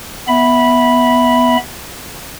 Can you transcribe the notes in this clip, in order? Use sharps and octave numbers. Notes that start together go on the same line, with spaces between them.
B3 E5 B5